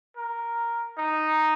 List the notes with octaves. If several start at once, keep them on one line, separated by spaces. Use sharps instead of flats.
A#4
D#4